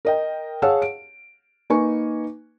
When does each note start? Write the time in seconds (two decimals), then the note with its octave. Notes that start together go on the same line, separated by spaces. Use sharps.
0.05 A#4 D#5 G5
0.62 G#4 C#5 F5 F#5 A5 E6
0.82 D7
1.70 A#3 D#4 B4 G#5 C#6